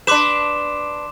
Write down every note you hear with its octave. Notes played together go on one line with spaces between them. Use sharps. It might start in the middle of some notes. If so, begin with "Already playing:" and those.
D4 B4 C6 D6 E7